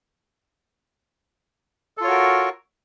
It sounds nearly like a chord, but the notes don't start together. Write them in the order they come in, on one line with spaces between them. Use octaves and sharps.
A4 F4 C#5 F#4 A#4